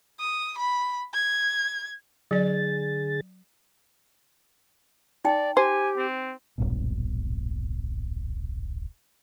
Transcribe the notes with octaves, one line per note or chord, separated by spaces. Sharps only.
D#6
B5
G#6
D3 F#3 G#4 D5 A6
D#4 D5 G5
G4 C5 G#5
C4
D1 A#1 G2 B2